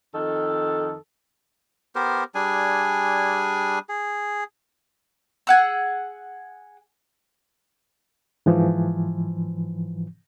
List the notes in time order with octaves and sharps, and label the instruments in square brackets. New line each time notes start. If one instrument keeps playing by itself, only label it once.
[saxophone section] F2 D#3 A4
[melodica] B3 G4 A#4 C5
G3 D4 G#4 G#5
G#4
[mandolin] G#4 F#5 E6
[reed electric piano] G#2 E3 F3